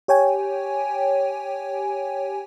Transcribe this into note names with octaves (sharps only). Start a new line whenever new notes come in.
G4 C#5 G5 G#5